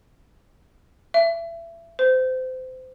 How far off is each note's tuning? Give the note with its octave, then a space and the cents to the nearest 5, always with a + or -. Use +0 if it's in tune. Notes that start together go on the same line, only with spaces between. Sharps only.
E5 +25
C5 -25